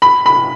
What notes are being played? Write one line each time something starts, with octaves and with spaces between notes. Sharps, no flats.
B5
B5